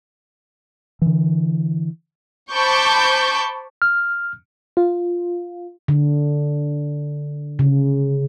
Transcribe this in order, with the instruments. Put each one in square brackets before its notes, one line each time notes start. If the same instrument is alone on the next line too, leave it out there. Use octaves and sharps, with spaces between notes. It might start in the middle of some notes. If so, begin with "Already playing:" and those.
[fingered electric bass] D3 E3
[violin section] C5 A5 B5 C#6 D6 G6
[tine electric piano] F6
[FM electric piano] F4
[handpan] D3
C#3